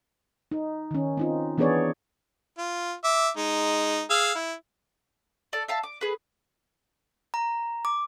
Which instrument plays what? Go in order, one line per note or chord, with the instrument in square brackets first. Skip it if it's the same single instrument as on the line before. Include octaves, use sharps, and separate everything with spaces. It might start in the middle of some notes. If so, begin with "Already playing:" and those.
[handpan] D#4
D#3 C#4
C4 D#4 F4
E3 B3 D4 G#4 C#5 D5
[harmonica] F4
E5 D6
G#3 D#4
G#4 F5 E6
E4
[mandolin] A4 D5
E5 F5 A5
D6
G#4 B4
[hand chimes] A#5
D6